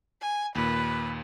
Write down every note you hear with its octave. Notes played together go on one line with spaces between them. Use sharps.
G#5
D#2 A#2 B4